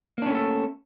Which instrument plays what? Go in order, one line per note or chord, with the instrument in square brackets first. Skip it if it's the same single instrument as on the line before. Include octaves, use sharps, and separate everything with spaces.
[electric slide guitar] A#3
D4
C#4
A3
A4